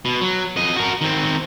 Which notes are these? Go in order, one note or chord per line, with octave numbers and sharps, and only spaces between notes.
B2
F#3
F2 D#5
F#4 A#4
D#3 C4